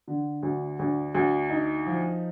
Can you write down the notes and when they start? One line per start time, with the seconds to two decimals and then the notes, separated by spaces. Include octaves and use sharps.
0.08 D3
0.43 D2
0.79 D2
1.15 D2
1.50 D#4
1.86 F3